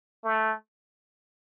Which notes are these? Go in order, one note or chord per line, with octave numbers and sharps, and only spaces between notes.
A3